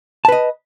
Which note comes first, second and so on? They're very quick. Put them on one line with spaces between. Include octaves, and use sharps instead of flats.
A5 B4 D#5